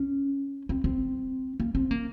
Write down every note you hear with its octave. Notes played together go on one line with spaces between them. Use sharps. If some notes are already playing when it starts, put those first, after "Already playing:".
Already playing: C#4
C4
C4
A#3
C4
A#3